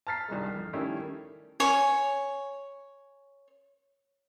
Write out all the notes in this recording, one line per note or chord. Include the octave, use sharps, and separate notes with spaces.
A5 A#5 F6 A6 B6 C7
C2 G2 D#3 G#3
F2
D#3 G3 A3 C#4 E4 G4
C#5 G#5